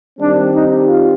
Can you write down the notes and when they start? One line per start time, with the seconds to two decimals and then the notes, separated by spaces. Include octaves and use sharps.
0.18 D#3 G3 C4 D4
0.52 D#4
0.86 F4